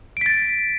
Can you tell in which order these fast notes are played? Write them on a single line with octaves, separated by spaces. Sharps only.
D7 B6 A6